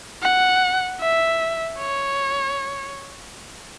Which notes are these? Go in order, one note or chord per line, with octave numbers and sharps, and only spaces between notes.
F#5
E5
C#5